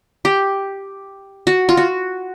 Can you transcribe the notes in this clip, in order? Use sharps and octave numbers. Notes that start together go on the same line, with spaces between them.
G4
F#4
F4
F#4